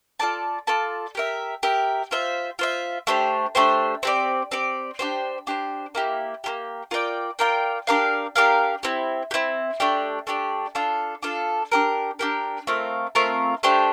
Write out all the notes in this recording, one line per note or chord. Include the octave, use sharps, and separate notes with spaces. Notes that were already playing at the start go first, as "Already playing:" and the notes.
F4 A4 D5 A5
F4 A4 D5 A5
G4 A#4 E5
G4 A#4 E5
F4 C5 E5
F4 C5 E5
A3 D4 G4 C5
A3 D4 G4 C5
C4 G4 D5
C4 G4 D5
D4 G4 C5
D4 G4 C5
A#3 E4 G4
A#3 E4 G4
F4 A#4 D5 G5
F4 A#4 D5 G5
D4 G4 A#4 F5
D4 G4 A#4 F5
C4 E4 G4
G4
C4 E4
A3 D4 G4 D5
A3 D4 G4 D5
D4 F4 A4
D4 F4 A4
D4 G4 A#4
D4 G4 A#4
A3 C4 F4 A#4
A3 C4 F4 A#4
A3 D4 G4 C5